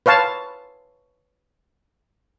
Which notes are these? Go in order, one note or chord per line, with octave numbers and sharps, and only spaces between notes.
B4 C#5 F5 A5